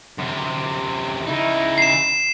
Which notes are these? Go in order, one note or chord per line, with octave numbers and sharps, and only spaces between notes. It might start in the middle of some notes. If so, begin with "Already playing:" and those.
F#2 C3
C#3 D#4 E4
C7 E7